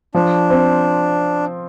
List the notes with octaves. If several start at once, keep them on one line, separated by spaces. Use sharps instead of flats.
F3 D4
C4